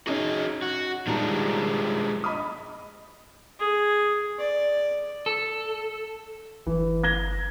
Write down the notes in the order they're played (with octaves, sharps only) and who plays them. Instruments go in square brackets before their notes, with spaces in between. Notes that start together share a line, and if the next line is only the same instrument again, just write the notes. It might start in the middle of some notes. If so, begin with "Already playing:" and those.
[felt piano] C#4 D#4 [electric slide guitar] F#4 G#4 D#5
[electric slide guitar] F#4
[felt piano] D#3 G3 A#5 [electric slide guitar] F3 G#3 D4
[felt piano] D#5 B5 D#6
[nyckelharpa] G#4
D5
[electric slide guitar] A4
[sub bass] G1 [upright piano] E3
[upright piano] G#6 A#6 G7